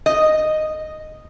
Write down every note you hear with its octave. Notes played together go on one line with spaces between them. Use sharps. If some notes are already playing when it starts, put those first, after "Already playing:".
D#5